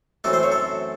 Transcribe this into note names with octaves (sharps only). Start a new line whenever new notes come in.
F#2 E3 A3 C4 A4
C5
C#5
A4